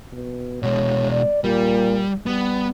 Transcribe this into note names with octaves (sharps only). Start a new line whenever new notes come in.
B2
B2 G#3 C#5
D5
A#2 G3
G3 B3